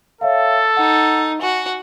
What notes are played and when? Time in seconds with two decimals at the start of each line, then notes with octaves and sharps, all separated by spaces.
0.21 A4 C#5 E5 F5
0.77 D#4 F#5
1.41 F#4 G#5